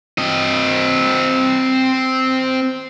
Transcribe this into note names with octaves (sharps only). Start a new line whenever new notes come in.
C4 D#5